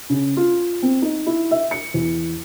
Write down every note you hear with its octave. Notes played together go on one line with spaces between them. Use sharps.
C#3
F4
C4
D#4
E4
E5
C#7
E2